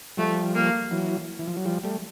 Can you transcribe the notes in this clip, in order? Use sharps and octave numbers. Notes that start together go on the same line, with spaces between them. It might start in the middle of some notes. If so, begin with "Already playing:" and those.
F3 G3 A3
A#3
E3 F#3
E3
F3
F#3
F3 G3
G3 A3